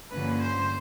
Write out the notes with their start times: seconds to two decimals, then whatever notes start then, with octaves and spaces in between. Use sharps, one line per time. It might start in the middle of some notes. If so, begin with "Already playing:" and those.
0.11 G2 D3 F3 A#3 C#4 B4
0.41 C5